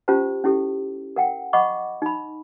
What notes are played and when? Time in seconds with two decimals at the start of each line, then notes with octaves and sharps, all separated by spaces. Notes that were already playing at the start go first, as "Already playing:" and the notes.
0.08 C#4 F4 G4 C5 A5
0.44 C#4 E4 G4 A4
1.16 A#4 F#5 G5
1.53 D#5 F#5 B5 C#6 D6
2.02 D#4 B5